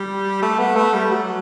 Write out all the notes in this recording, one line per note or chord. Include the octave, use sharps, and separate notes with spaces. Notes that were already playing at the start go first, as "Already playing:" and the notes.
Already playing: G3
A3
B3
A3
G3
F#3